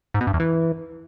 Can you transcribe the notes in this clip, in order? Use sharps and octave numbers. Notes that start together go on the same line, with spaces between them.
G#2
B2
G2
E2
E3